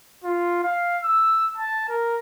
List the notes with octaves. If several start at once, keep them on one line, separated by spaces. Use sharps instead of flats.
F4
F5
E6
A5
A#4